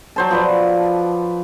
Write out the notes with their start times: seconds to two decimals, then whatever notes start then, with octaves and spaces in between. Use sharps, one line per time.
0.16 F#3 C5 A5
0.31 F3 B4 D5